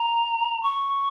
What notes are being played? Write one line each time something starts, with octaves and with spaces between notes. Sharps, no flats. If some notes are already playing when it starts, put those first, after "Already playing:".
Already playing: A#5
C#6